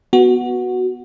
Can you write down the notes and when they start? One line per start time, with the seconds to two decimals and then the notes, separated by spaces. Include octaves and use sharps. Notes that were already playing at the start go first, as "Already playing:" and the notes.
0.13 B3 F#4